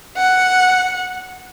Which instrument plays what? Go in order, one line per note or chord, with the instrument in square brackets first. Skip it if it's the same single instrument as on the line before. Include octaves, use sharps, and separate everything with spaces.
[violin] F#5